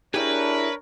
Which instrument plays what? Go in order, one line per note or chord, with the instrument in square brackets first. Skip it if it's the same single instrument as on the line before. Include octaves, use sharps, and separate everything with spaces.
[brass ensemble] D4 A#4 C#5 [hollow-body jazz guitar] E4 G4 G#4 [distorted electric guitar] B4